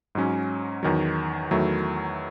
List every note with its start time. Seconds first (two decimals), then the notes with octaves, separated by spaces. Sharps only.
0.15 G#2 F#3 C#4
0.83 E2 D#3 F#3
1.51 E2 D#3 F#3 A3 E4